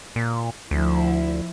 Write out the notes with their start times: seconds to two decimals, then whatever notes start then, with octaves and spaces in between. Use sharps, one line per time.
0.16 A#2
0.71 D2 F3 E4